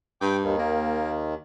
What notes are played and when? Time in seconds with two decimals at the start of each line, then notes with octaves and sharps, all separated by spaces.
0.21 G2 G5 D6
0.44 D#2 D#3
0.58 A#3